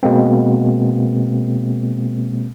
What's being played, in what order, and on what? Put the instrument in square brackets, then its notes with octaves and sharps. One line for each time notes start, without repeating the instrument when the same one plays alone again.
[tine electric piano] B2 G#3 A#3 C4